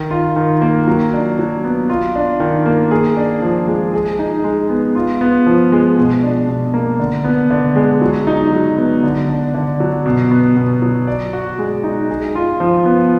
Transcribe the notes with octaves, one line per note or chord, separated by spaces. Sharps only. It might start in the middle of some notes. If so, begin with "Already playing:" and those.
Already playing: D#3
F4
D#3
A#3
F#3
D4
F#3
B3
F4
D4
D#3
A#3
G#4
D4
F3
G#3
G#4
D#4
G#3
B3
F4
B3
F3
G#3
B2
D4
B2
A#3
D3
B3
D3
G#3
F#3
D#4
F#3
B3
D3
D4
D3
F#3
B2
B3
B2
F#3
D5
F#4
G#3
D#4
G#4
F4
F3
B3